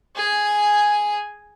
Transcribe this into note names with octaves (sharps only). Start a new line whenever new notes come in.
G#4 G#5